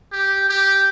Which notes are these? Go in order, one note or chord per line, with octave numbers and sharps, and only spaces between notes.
G4
G4